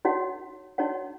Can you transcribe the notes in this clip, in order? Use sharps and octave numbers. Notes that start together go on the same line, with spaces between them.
D#4 F#4 C#5 F#5
D#4 F#4 C#5 F#5